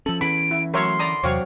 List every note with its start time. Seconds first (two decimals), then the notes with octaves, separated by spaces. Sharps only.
0.06 F3 C#4 A4 F#7
0.21 E2 E3 C#4 B5 D7
0.51 E4
0.74 F#3 A3 A#4 C#5 E5 C6
0.99 D3 D5 A#5 B5 D#6
1.24 E2 C3 F#3 C4 D4 C#5 F5